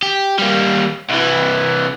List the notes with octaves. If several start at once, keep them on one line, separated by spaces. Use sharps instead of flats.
G4
G3 A#3
C2 E3